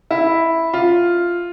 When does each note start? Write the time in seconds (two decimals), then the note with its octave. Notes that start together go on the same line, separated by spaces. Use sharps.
0.11 E4
0.74 F4